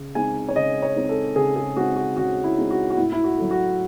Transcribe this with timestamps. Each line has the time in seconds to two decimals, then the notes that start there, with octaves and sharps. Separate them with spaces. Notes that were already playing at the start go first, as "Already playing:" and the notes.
Already playing: C#3
0.15 G#3 C4 D#4 G#5
0.49 C#5
0.56 C#3 D#5
0.82 C#5
0.96 G#3 C4 D#4
1.09 A4
1.36 C#3 G#4
1.56 G#4
1.76 G#3 C4 D#4 F#4
1.96 F#4
2.17 C#3 F#4
2.44 E4
2.57 G#3 C4 D#4
2.71 F#4
2.90 F#4
2.97 A2 E4
3.12 E4
3.24 F#4
3.37 F#3 A3
3.51 F#4